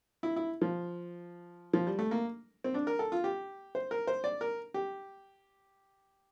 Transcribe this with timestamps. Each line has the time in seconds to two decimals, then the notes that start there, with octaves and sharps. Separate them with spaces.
0.23 E4
0.36 E4
0.62 F3
1.73 F3
1.87 G3
1.99 A3
2.11 A#3
2.64 C4
2.74 D4
2.87 A#4
2.99 A4
3.12 F4
3.24 G4
3.75 C5
3.91 A#4
4.07 C5
4.24 D5
4.41 A#4
4.74 G4